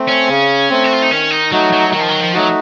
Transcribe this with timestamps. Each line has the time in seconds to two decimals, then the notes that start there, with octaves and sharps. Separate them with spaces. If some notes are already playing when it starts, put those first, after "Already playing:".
Already playing: A3 C4
0.08 C#4
0.28 C#3
0.70 A3 C4
0.84 F#4
0.93 F4
1.02 D#4
1.11 D#3 C#4
1.31 D#4
1.52 F#3 A3 D#4 F#4
1.72 F#3
1.92 D#3 F#3
2.00 F3
2.08 F#3
2.21 F3
2.33 F#3 A3 D#4 F#4